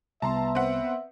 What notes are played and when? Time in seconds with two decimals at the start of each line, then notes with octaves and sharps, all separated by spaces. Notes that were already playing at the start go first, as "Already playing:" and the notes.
0.22 C2 B3 E5 A5 A#5 C6
0.55 C4 B4 F#5